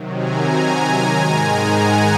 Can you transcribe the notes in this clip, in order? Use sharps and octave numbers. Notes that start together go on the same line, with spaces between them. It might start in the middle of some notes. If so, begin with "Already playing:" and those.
Already playing: C3 D#3 F#3
G#5 A#5
G#2 D#3 G#3
F#5 G#5